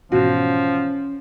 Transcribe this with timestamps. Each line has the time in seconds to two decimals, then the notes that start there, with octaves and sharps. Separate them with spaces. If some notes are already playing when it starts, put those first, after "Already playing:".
0.12 G#2 B2 E3 F3 C#4 F#4